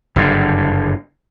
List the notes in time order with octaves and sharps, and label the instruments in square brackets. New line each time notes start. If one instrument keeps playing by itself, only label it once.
[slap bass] F#1 G2 D3